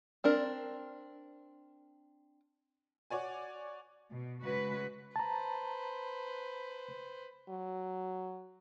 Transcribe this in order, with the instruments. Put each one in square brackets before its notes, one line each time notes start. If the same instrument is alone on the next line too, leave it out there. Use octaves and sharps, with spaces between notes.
[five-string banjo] C4 D4 A#4
[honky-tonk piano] F#4 C#5 D5 G#5
[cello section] B2
C#3 G#3 F#4 B4
[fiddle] B4 C5 [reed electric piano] A5 A#5
[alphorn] F#3